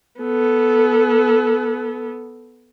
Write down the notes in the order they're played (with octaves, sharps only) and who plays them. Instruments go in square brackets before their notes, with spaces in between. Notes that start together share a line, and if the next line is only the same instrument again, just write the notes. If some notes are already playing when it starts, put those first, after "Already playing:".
[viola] B3 A4